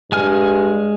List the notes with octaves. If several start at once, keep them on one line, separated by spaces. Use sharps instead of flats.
G2 G#3 G#5 F6